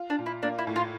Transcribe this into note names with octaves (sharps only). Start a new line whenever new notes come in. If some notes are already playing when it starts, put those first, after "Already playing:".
Already playing: F4
D4
A#2
E4
A#3 D4
E4
A2
F4